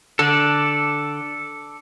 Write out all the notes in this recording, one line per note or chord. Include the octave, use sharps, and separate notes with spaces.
D3 A4 D5